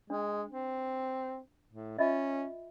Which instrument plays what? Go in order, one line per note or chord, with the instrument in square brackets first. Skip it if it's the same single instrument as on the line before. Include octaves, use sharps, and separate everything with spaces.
[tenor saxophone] G#3 [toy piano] D4
[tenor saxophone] C4
A2
[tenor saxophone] C#4 [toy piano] F4 D#5 E5